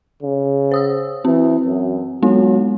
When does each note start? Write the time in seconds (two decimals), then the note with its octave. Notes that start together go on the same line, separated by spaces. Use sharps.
0.22 C#3
0.72 C5 D#6 E6
1.25 E3 C4
1.66 F#2
2.23 F#3 G#3 B3 D#4